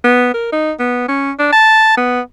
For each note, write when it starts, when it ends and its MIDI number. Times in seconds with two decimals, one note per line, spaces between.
0.04 0.33 59
0.34 0.52 70
0.53 0.72 63
0.79 1.06 59
1.08 1.32 61
1.39 1.50 62
1.53 1.95 81
1.97 2.20 59